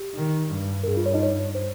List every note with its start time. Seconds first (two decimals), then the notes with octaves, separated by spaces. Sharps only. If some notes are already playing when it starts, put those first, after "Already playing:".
Already playing: G4
0.15 D#3
0.51 G2
0.84 A#4
0.87 G2 G#4
0.97 F4
1.06 C#5
1.14 D#4 D#5
1.23 C#5
1.55 C5